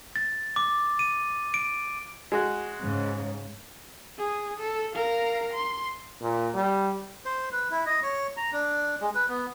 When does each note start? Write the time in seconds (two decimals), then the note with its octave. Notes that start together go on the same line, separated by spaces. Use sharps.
0.16 A6
0.56 D6
0.99 D#7
1.54 D7
2.32 G#3 F#4
2.80 G#2 C#3
4.18 G#4
4.60 A4
4.94 A#4 F5
5.53 C6
6.21 A#2
6.54 G3
7.25 C5
7.52 B4
7.71 E4
7.86 D#5
8.03 C#5
8.37 A#5
8.53 D4
9.01 G#3
9.15 B4
9.29 B3